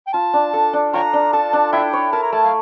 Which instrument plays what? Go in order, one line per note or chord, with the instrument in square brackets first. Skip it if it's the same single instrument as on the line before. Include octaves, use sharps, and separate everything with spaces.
[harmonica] G5
[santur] F4 [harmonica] A5
[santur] D4
A4
D4
[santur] F4 [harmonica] C#5 G5 A#5
[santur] D4
[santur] A4 [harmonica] A5
[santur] D4
[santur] E4 [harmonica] E5 G5
[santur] C#5
[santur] A#4 [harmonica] A5
[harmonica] A#5
[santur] A3 [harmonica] A5
[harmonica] F5